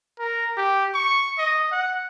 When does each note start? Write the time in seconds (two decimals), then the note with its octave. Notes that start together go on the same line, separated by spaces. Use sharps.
0.19 A#4
0.57 G4
0.94 C#6
1.38 D#5
1.72 F#5